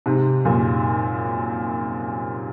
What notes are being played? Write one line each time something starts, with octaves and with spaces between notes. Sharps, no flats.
G#2 C3
F#2 A#2